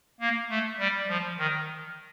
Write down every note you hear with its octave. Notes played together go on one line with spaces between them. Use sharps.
A#3
A3
G3
F3
D#3